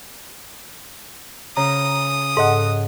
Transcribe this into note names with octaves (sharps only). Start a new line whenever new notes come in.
C#3 A#5 D#6
G#2 A4 D#5 F#5